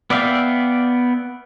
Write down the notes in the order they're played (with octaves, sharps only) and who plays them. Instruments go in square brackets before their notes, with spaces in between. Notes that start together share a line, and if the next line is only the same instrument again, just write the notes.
[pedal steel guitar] B3 D5 E5 F5 G5